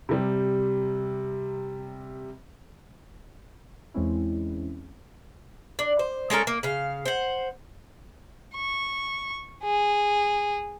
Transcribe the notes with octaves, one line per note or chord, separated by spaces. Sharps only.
C3 G3
E2 E3 G#3 C4 C#4 E4
D4
C5
G#3 C#4 A4 A#4
A#3
C#3 F5
C5 F#5
C#6
G#4